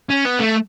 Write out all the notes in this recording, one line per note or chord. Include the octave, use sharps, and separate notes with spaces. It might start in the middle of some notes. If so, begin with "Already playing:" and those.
C#4
B3
A3